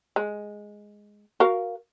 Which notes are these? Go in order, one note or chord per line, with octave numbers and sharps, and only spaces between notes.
G#3
F#4 A#4 F5